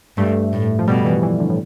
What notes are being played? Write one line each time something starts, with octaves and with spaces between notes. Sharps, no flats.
G2 A3
A2
F3
B2 G3
E3
E3
D3
A2